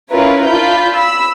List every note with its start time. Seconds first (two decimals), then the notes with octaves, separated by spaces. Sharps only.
0.10 C#4 E4 F4 A#4 B4 C#5
0.46 D4 F4 B5 G6
0.95 B5 E6